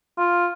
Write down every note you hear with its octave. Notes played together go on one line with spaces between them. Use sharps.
F4